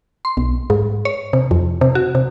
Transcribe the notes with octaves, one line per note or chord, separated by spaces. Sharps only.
C6
B1
G#2
C#5
C3
F2
C3
F#4
C3